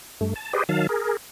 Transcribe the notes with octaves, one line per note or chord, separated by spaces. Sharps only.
G2 A3
A5
G4 G#4 B4 C5 D5 D#5
D#3 F#3 F5 A5
G#4 A#4